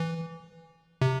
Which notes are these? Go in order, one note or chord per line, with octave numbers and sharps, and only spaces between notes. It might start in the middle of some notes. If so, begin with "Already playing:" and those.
Already playing: E3
C3